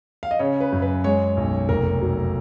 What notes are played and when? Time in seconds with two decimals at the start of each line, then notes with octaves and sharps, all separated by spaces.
0.23 F5
0.31 D#5
0.39 C#3 C#5
0.61 B4
0.72 F#2
0.82 B4
1.04 G#3 C#5
1.37 B1
1.69 F1 A#4
2.02 F#3